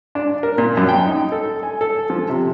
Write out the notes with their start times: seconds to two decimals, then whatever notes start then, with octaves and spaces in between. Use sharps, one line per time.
0.15 D4
0.43 A#4
0.58 A#2
0.77 F#2
0.88 G5
1.07 D#4
1.32 A4
1.63 G#5
1.81 A4
2.10 F3
2.29 C3